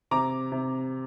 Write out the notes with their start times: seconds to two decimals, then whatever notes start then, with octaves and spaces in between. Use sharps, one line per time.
0.11 C3 A#5 D6
0.52 C3